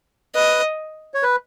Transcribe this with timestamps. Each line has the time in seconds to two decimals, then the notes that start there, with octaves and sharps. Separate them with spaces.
0.35 B4 D#5
1.14 C#5
1.23 B4